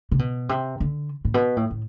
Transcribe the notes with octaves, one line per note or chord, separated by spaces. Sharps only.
C3
B2
C3
D3
A2
B2
A2
A2